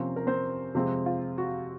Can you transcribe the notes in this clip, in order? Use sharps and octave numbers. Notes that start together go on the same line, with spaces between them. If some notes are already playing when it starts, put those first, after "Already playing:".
Already playing: C3 F3 A#3 C4 C#4 C5
A#4
C4 C5
C3 F3 G#3 C4
F4
F#4